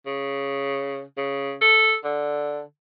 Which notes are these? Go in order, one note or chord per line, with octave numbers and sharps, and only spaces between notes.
C#3
C#3
A4
D3